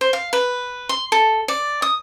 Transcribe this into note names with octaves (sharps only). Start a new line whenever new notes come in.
C5
F5
B4
C6
A4
D5
D#6